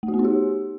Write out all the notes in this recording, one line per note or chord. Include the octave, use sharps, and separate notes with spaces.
A3
F#4
B3
D#4
G4